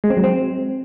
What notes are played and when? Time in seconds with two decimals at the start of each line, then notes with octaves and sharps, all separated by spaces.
0.04 G#3
0.10 C4
0.17 F#3
0.24 C4